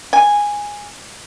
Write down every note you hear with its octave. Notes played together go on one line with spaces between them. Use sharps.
G#5